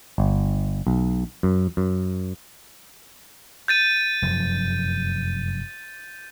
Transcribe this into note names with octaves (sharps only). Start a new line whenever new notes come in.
G1
B1
F#2
F#2
G6 A6 D#7
F1 F#2 F3